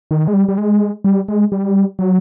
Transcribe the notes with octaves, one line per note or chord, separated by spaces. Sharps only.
D#3
G#3
G3
G3
G#3
G3
G#3
G3
F#3